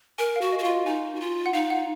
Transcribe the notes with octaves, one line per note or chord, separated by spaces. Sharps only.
A#4 G#5
F5
F#4
D#5
F#4
F4 F5
D#5
D#4 G#5
F#4
F4
F#5
D#4 F5
F#5